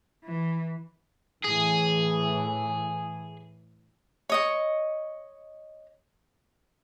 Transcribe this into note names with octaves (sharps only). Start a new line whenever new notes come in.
E3
A2 E3 G#4
C#5 D#5 C#6